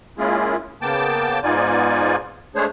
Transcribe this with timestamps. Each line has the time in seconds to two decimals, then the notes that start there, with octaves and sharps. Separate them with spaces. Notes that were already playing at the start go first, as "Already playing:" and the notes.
0.18 G#3 A#3 C#4 E4 F4 G#4
0.82 C#3 A#3 B3 G5 A5 D6
1.44 G#2 B3 D#4 F4 D5 G#5
2.56 G#3 A3 D4 G#4 C5 C#5